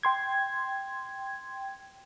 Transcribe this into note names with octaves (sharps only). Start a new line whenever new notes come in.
G5 C6 G#6